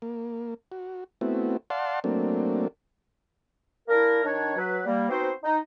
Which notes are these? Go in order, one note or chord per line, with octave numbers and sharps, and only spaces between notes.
A#3
F#4
A3 B3 C4 E4 F#4
D5 F5 F#5 A5 C6
F#3 A3 A#3 C4 D4
A#3 D4 E4 A#4
D#3 D4 C#5
F#3 B4
G3 A#3
B3 C4 D#4 F#4 C5
D#4